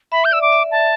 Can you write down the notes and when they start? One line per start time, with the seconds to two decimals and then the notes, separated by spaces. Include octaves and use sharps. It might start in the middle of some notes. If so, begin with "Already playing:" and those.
0.12 E5 B5
0.25 G6
0.31 D5 E6
0.42 D6
0.52 E5
0.71 A5